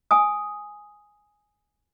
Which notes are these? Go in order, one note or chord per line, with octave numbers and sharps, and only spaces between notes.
G#5 D#6